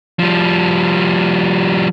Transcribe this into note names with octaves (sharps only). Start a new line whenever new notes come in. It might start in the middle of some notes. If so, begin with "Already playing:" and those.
F3 G3